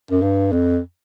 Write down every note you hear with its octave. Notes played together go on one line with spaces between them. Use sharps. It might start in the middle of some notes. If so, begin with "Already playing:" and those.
F#2
G2
F2